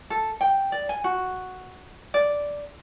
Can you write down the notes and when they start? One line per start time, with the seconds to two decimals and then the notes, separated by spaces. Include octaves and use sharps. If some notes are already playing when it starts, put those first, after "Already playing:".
0.10 A4
0.41 G5
0.72 D5
0.89 G#5
1.04 F#4
2.14 D5